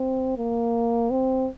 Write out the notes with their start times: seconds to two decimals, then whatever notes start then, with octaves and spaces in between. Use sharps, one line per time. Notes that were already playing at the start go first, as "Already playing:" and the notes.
Already playing: C4
0.38 A#3
1.11 C4